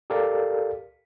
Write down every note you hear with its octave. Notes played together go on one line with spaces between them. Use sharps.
G4 A4 A#4 D5 F5